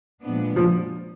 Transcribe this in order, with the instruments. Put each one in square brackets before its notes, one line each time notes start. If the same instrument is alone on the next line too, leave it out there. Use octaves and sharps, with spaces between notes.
[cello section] A#2 F3 G#3 B3 D4
[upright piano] F3